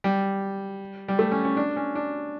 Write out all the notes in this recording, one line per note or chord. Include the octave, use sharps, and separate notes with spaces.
G3
G3
A3
C#4
C#4
D4
C#4
D4